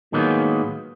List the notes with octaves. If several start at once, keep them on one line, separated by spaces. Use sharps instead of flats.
A2 D#3 F#3 G#3 A#3 B3